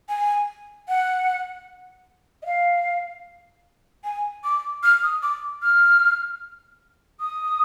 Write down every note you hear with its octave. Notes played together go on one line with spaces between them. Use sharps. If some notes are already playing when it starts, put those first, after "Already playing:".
G#5
F#5
D#5
F5
G#5
D6
F6
D#6
D6
F6
D#6